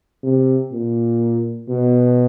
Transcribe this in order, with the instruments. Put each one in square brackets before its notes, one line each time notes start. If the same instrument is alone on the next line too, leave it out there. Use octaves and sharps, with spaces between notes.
[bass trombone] C3
A#2
B2